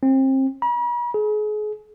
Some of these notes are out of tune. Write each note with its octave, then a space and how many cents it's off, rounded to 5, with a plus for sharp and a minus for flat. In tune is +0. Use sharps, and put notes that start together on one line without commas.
C4 +30
B5 -45
G#4 +35